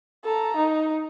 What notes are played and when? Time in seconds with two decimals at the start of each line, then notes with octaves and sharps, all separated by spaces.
0.25 A4 A#5
0.57 D#4